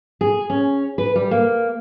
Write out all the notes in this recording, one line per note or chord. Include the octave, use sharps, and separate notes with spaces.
G#4
C#4
B4
G3
A#3